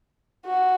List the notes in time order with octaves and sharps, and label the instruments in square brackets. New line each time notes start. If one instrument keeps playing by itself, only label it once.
[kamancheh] F#4